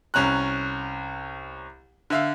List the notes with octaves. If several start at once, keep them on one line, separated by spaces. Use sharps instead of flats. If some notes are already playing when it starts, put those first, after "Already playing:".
C2 C#4 A#5 F#6
D3 E5 F5